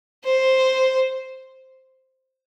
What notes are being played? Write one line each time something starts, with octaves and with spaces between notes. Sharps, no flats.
C5